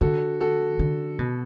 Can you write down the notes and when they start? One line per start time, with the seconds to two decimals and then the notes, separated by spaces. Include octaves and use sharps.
0.01 D3 F#4 A4
0.40 F#4 A4
0.79 D3
1.19 B2